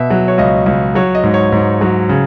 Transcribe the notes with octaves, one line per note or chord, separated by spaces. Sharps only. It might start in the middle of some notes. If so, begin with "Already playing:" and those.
Already playing: B2 E5
F#3
C#5
C#2 D#5
C#2
F#3 C#5
D#5
G#2
C#5
G#2
F#3
C#3